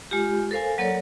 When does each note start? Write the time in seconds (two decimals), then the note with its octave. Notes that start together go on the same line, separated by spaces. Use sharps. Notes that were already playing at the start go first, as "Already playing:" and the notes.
0.11 G#3 F4 G4
0.51 A4 A#4 C5 F5 G#5
0.78 F#3 A#3 A4 A#4 C#5 D5